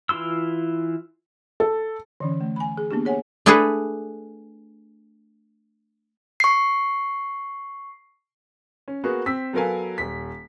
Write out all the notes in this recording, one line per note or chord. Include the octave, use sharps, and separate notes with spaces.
E3 E4 F4 C6 E6
A4
D3 E3 C#4
A3
G#5 B5
G#4
A#3 B3 D4 G4
G#4 C#5 F#5 G#5
A3 D4 E4 G#4 A4 B4
C#6 C7
C#4
A#3 B3 F#4 G#4
C4 E6 B6
F#3 B3 A4 A#4 F5 G#5
D#1 B6